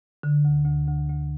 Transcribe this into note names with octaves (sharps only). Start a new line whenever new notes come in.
D3
D2
D2
D2
D2